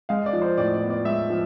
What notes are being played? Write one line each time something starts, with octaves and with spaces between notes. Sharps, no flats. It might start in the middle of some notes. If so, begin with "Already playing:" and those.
G#3 F5
D5
F3
C5
A2 D5
D5
B3
D5
G#3 E5
F3